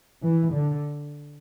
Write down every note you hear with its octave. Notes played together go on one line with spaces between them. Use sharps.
E3
D3